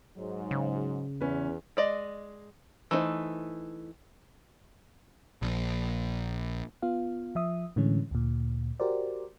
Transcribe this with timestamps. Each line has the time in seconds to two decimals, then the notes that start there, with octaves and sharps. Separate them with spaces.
0.17 G#2 F#3
0.51 C#3
1.21 E2 C#4 B4
1.77 G#3 D5 D#5
2.91 E3 A3 D4 D#4 C5
5.42 A#1
6.82 B3 F4 F5
7.35 F3 E5 D#6
7.76 A2 D3 E3 G#3 C#4
8.11 D2 A#2
8.80 F#4 G4 A#4 C5 D5